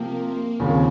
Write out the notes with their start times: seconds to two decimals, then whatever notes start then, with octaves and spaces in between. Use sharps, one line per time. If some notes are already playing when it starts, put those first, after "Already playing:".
Already playing: C3 F3 A#3 C4
0.60 D#2 C#3 F3 A#3 C4